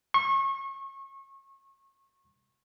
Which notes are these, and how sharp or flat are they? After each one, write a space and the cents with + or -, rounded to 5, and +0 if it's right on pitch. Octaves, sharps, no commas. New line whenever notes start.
C#6 -30